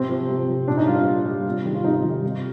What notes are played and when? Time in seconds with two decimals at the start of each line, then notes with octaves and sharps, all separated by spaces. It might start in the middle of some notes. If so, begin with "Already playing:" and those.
Already playing: C3 C4
0.09 F3
0.29 C3
0.48 F3
0.67 A#2 D4
0.77 D#4
0.87 G3 F4
1.07 A#2
1.26 G3
1.46 C3
1.65 D#3 G3
1.74 F4
1.84 C3 D#4
2.04 D#3 G3
2.24 C3